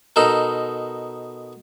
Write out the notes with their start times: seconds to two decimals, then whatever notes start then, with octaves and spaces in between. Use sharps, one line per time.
0.16 B2 D#4 A4 A#4